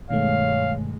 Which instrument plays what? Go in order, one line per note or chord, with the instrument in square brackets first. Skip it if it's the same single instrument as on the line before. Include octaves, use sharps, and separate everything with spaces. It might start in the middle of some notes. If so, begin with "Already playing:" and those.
[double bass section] G2 G#3 [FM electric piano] B2 D#3 A3 [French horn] C#5 [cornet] F5